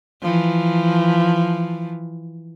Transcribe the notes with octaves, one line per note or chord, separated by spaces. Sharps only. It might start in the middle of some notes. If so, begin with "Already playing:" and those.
E3 F3